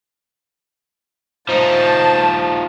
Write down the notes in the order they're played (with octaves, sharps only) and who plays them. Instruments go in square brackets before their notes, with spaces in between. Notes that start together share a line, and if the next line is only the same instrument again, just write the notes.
[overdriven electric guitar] F3 D#4 [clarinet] C5 [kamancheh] A5